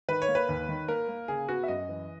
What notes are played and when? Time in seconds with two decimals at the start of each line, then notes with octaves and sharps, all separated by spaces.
0.09 D#3 B4
0.22 C#5
0.28 A#3
0.35 B4
0.49 D#2
0.68 D#3
0.88 A#3 A#4
1.08 A#3
1.28 C#3 G#4
1.48 B3 F#4
1.63 E5
1.68 F#2 D#5
1.88 E3